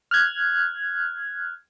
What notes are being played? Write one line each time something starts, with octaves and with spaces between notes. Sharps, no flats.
F6 F#6 G#6